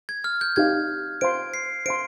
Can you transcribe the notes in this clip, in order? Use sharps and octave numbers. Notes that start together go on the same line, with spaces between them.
G#6
F6
G6
D#4 G4 C5 F5 G#6
C5 F5 C6 D7
C7
C5 F5 C6 D7